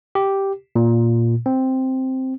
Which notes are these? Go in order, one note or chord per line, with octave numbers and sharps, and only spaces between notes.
G4
A#2
C4